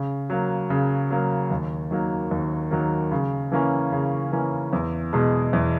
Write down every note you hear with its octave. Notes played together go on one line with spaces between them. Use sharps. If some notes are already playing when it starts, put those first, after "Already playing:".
Already playing: C#3
F#3 A#3
C#3
F#3 A#3
D#2
D#3 F#3 A#3
D#2
D#3 F#3 A#3
C#3
E3 A#3 C#4
C#3
E3 A#3 C#4
E2
B2 G#3
E2